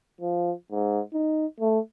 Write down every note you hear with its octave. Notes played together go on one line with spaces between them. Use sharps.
F3
G#2
D#4
A3